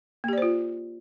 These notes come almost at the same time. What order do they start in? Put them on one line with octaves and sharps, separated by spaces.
A#3 G4 D5 C5 F4